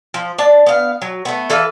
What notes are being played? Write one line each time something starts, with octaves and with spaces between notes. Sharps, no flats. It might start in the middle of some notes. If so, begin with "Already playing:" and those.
F3
D4 A5
B3 F5
F#3
A3 B3
E3 A4 B4 F5